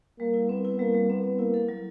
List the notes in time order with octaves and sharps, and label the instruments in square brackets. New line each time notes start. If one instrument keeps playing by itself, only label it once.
[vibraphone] G3 [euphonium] A#3
[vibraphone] E4
[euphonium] B3 [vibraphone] C4
[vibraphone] E4
[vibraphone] G3 [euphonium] A#3
[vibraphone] G3
[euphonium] B3 [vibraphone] C4
[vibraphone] C4
[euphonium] A#3 [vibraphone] E4
[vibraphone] A4
F#3